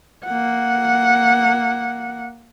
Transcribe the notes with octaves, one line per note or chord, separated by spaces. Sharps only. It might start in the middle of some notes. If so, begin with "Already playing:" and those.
A#3 F#5